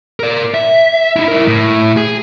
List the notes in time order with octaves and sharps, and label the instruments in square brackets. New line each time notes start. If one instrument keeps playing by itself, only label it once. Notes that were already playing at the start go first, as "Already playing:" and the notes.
[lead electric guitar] A#4 D5
E5
D#4 E4
E4 A#4
A2
G#4